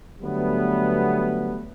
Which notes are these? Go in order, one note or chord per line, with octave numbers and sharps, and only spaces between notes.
D3 F#3 G3 A3 B3